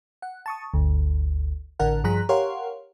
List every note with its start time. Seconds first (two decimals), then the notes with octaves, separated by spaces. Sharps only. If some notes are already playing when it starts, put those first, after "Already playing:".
0.22 F#5
0.46 A5 C#6 D#6
0.74 G1 D2
1.79 A1 D3 D4 A#4 F#5
2.04 G2 F3 G#4 A#5 F#6 B6
2.29 G4 A#4 C#5 F5 F#5 C6